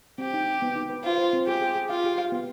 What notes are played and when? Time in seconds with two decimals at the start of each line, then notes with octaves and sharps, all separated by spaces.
0.18 C4 G4
0.34 D#4
0.47 D#4
0.62 B3
0.76 D#4
0.89 B4
1.04 F4 C5
1.18 C5
1.33 C4
1.46 G4 G#4
1.61 G#4
1.76 G#4
1.89 F4 F5
2.04 G4
2.18 F5
2.32 B3